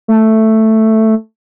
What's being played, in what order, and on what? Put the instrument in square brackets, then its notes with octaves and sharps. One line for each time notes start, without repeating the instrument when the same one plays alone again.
[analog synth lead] A3